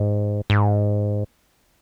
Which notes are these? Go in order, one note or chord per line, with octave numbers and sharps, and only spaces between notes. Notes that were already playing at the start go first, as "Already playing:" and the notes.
Already playing: G#2
G#2